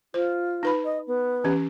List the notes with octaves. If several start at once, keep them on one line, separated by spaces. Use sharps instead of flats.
F4 C5
D#4 B4 B5
D#5
B3
E3 C#4 G4